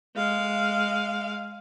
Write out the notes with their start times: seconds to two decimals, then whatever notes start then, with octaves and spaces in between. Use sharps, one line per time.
0.16 G#3 F5